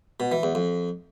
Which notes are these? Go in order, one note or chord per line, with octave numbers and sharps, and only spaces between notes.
B2
E3
E2
F2